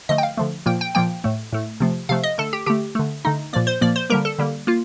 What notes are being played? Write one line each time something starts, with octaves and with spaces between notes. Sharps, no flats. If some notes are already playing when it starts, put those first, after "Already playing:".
D3 F3 A3 D#5
G5
F5
D3 F3 A3
A#2 F3 A#3 G5
G5
A#2 F3 A#3 G5
A2 A3
A2 A3
C3 F3 A3
C3 F3 A3 F5
D#5
D3 A3 A4
G4
D3 A3 G4
D3 A3
D3 A3 D#4
A#2 F3 A#3 D5
C5
A#2 F3 A#3 D5
C5
D3 G3 A#3 A#4
A4
D3 G3 A#3
A#3 F4